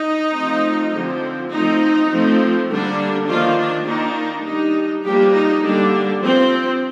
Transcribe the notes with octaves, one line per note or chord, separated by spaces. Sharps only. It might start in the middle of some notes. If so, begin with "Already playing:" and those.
Already playing: D#4
F3 A3 C4
D3 F3 C4
F3 A3 C4 D#4
F3 A3 C4
D3 G3 A#3 D4
D#3 F3 A#3 D4 F4
D4
D#3 A#3 D4 D#4
G3 D4 D#4
F3 G3 A#3 D4 G4
D#4
D3 G3 A#3 D4
F3 C4